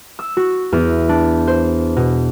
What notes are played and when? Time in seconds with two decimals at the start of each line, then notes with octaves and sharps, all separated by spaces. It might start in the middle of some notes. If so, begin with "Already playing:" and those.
0.19 E6
0.37 F#4
0.72 E2
1.09 D4
1.48 C5
1.96 B2